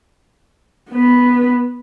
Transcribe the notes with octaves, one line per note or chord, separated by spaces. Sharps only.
B3 B4